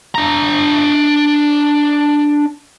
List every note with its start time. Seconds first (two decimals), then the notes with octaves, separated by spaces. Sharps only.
0.15 D4 A#5